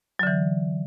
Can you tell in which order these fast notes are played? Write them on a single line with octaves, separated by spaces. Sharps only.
F#3 D3 E3